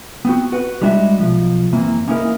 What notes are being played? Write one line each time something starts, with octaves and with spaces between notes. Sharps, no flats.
B3 C4 F#4
F#4 B4 F#5
G3 G#3 D4 F#4 D#5 E5
B1 F3
F#2 E3 A#3 C4
A#3 C#4 D#4 E4 A4 A#4